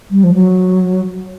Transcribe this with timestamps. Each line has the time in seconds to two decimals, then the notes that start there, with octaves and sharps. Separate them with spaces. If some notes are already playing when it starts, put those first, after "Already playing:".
0.11 G3
0.24 F3
0.34 F#3